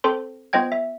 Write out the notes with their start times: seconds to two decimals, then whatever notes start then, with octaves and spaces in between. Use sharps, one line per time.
0.04 C4 A4 C5 C6
0.53 B3 F4 C5 D#5 G5 G#6
0.72 E5